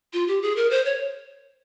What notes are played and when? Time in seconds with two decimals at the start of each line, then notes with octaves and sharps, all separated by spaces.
0.13 F4
0.28 G4
0.42 G#4
0.56 A#4
0.71 C5
0.85 C#5